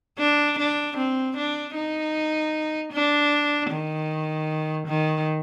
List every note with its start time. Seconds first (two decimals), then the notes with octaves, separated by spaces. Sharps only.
0.19 D4
0.59 D4
0.97 C4
1.36 D4
1.75 D#4
2.93 D4
3.70 D#3
4.87 D#3